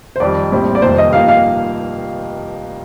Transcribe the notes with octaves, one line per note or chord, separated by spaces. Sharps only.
C5
F2 D#3 G3 D5
A#1 A2 G3 C4
D5
F1 F2 D#3 G3 A#3 C5
D#5
G2 F3 A#3 D#4 G4 F5
F5